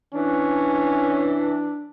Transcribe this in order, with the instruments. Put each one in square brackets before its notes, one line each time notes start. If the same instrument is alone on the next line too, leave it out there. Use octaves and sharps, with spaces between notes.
[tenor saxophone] E3 [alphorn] C#4 [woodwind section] D4